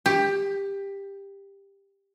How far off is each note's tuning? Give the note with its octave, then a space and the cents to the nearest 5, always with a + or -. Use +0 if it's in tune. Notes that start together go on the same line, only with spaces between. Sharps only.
G4 +15